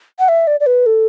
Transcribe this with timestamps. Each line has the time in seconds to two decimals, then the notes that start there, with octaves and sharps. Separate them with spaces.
0.19 F#5
0.29 E5
0.47 D5
0.60 D5
0.66 B4
0.86 A4